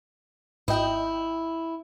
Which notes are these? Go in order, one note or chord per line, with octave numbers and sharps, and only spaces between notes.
G#1 E4 D#5 G5